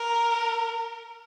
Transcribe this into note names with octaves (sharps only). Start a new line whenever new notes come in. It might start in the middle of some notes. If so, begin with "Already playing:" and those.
Already playing: A#4